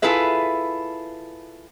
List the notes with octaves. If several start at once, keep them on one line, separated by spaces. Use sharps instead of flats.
E4 F4 G#4 A4 B4 E5